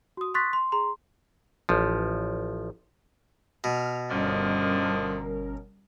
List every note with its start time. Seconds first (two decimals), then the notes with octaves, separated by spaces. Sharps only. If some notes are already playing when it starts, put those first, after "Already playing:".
0.17 F#4 D#6
0.34 C6 C#6 D#6 F#6 A6 B6
0.53 C6
0.72 G#4 A#5 C6
1.69 A1 F3
3.64 B2 F6
4.11 G1 D3 D#3 F3 G3 C#4 A#4